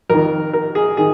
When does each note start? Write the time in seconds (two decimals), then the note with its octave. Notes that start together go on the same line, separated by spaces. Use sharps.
0.09 F2 D#3 A#4
0.53 A#4
0.75 G#4
0.97 D#3 G#4